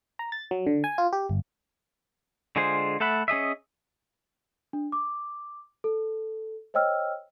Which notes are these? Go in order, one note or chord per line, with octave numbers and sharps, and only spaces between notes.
A#5
A6
F#3
D3
G#5
F4
G4
G1
D3 G#3 F4 G#4 C5
A3 A4 E5 F#5 B5
C#4 G#4 D#5 E5
D4
D6
A4
C5 C#5 D#5 G5 E6 F6